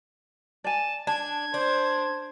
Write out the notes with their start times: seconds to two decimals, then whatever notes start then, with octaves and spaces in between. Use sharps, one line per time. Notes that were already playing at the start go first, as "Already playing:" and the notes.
0.64 D5 G#5 A5
1.07 D4 A5 G#6
1.54 D4 C5